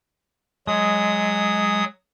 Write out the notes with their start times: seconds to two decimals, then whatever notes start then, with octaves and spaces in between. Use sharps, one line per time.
0.67 F#3 G#3 D#6